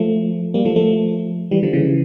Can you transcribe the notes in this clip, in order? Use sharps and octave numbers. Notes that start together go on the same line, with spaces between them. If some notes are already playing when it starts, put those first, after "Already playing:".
Already playing: F3 A3
G3 A#3
F3 A3
F3 A3
E3 G3
D3 F3
C#3 E3